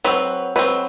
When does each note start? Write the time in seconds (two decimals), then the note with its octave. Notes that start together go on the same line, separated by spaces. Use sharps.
0.04 F#3 C4 B4
0.56 F#3 C4 B4